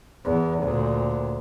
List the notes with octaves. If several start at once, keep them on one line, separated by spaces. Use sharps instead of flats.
E2
D2 A#2